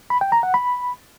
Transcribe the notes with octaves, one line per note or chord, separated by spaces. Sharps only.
B5
G5
A#5
F#5
B5